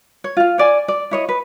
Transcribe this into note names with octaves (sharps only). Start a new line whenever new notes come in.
C#5
F4 F5
C#5 D5 G#5
D5
E4 C#5 D#5
B4